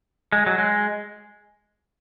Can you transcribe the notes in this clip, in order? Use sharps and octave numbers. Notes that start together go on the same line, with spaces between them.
G#3
F#3
G#3